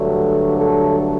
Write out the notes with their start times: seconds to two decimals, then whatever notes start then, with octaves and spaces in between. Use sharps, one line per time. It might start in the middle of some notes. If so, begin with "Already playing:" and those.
Already playing: G2 D3 F#3 A3
0.54 A4